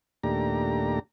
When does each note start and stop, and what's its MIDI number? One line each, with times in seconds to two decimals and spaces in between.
0.23 0.99 39
0.23 0.99 46
0.23 0.99 57
0.23 0.99 62
0.23 0.99 67
0.23 0.99 82